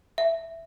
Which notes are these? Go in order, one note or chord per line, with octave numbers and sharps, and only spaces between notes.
E5